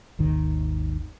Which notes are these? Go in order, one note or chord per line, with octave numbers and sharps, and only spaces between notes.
G#1 D#2 D#3